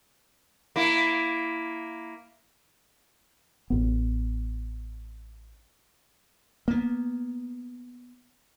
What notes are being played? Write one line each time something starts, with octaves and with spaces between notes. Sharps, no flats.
A#3 E4
A1 B3
A#3 B3